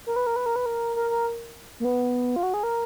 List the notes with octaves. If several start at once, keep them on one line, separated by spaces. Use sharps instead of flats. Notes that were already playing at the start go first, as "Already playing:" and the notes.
A#4
B4
A#4
B4
A#4
B4
A#4
A#4
A#4
A#3
B3
F4
F#4
G#4
A#4